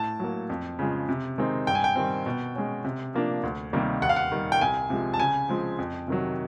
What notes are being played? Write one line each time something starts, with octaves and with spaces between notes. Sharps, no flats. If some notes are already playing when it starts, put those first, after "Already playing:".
Already playing: A2 A5
F#3 A#3
F2
C#3 F3 G#3
C3
D#3 G#3 C4 D#4
G2 G5
G#5
G5
D#3 G3 C4
B2
G#3 C#4
C3
F3 A#3 D4
D2
C3 D#3 G3 A#3
D#2 F#5
F5
F#5
D#3 G3
G5
C2 G#5
C3 F3 G#3
A5
C#3 G#5
F3 G#3 C4
F2
C3 D#3 F#3